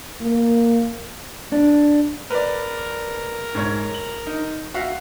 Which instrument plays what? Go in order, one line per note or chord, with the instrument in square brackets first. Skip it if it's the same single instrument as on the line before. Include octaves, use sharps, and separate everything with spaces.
[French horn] A#3
[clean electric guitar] D4
[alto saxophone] A#4 [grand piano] B4 D5
[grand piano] G#2 C#5
F#7
D#4
F#4 E5 F5